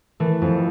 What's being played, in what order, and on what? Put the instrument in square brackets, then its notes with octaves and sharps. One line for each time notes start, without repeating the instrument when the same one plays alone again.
[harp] E3 A3
F2